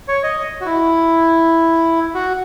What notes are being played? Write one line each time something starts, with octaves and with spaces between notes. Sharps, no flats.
C#5
D#5
F#4
E4
F#4